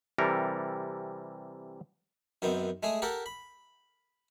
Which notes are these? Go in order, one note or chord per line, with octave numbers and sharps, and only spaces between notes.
C3 E3 G3 A4 A#4
F#2 D#3 B3 C4
G#3 A3 G#4
G4 A4 A#4 F#5
B5